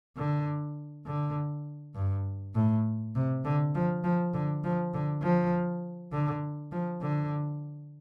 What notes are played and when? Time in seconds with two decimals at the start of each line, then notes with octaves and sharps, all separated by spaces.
0.17 D3
1.06 D3
1.95 G2
2.55 A2
3.15 C3
3.45 D3
3.75 F3
4.04 F3
4.34 D3
4.64 F3
4.94 D3
5.22 F3
6.12 D3
6.72 F3
7.02 D3